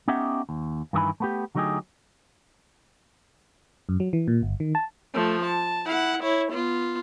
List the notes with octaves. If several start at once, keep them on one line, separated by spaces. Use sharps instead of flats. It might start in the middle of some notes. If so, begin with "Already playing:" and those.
B3 C#4 D#4 G4 E5 F#5
D#2
G2 D#3 E3 G#4 G#5 B5
A3 B3 G4
D3 F#3 A3 D#4 G4 G#4
F#2
F#3
E3
A#2
G1
D#3
A5
F3 A3
A5
E4 F#5
E4 C#5
B3 F4